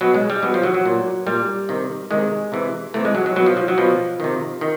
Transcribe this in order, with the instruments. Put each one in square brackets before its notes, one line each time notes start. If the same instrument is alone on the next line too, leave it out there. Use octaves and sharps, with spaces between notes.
[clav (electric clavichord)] B2 F#3
G#3
G3
B2 F#3
F3
F#3
F#3
A#2
A#2 G3
C3 D#3
C3 D#3 G#3
C3 E3
C3 E3 A3
G#3
F#3
F#3
B2 F#3
F3
F3
F#3
B2 F3
C3 D#3
D#3